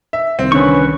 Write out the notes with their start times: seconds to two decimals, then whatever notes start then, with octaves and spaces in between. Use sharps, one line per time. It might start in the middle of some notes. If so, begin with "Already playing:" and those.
0.13 E5
0.39 C2 D#3 C4
0.52 D3 C#4 B4 C#6